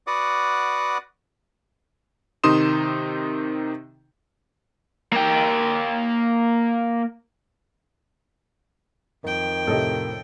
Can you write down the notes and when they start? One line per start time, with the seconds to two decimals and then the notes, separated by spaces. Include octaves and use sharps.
0.07 F#4 B4 D5 F#5 D6 D#6
2.44 C3 D#3 D#4 C6 D#6 E7
5.13 A#3 G5
9.24 F2 D#3 G5
9.67 A2 C3 A4 D#5